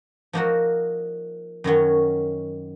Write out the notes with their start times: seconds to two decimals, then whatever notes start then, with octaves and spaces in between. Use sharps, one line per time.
0.33 F3 A#3 D#4 F#4 A#4
1.64 F#2 D#3 F#3 C#4